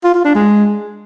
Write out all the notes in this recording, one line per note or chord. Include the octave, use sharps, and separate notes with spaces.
F4
F4
D4
G#3